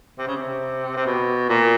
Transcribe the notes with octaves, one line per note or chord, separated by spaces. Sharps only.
C3
C#3
C3
C3
B2
A#2